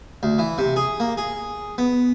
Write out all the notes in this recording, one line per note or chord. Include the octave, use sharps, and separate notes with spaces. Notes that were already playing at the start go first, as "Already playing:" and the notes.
D2
E3
C3
G#4
A#3
G#4
B3